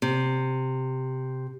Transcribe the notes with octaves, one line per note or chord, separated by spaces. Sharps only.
C3